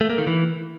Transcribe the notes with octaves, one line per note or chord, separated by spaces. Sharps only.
A3
A#3
D#3
E3